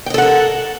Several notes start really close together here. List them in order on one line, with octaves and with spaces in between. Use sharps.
G5 D#5 A4 F#5 A#4